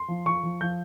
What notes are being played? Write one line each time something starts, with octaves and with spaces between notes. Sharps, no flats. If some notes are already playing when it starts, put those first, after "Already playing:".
Already playing: C6
F3
F3 C#6
F3
F3 G6